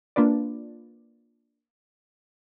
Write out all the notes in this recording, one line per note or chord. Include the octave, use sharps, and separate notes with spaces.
A#3 D4 F4 B4 D5